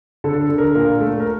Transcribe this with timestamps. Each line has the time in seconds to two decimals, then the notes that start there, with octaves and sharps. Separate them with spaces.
0.24 D3 A4
0.41 A4
0.50 D3
0.58 A#4
0.75 A#2 A#4
1.00 A3
1.20 A#4